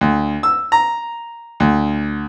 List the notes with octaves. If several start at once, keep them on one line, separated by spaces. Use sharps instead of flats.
D2
E6
A#5
D2